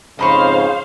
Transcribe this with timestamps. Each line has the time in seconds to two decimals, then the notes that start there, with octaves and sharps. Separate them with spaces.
0.19 F2 G#2 C#3 C5 D#5 F5 B5 C#6